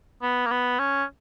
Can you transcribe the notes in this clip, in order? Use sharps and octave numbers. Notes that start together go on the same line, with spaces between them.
B3
A#3
B3
C#4